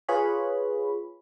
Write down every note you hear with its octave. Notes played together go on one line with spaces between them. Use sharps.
F4 G#4 B4 C#5 B5